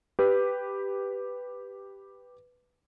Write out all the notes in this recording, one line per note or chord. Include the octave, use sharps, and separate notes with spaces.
G4 B4